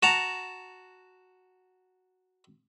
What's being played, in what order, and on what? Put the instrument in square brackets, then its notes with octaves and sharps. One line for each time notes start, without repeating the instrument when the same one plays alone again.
[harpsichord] F#4 A5 A#5